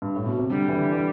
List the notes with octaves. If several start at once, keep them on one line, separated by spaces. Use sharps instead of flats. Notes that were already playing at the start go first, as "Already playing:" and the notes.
G2
A2
B2
C3
D3 G3
E3
D3
E3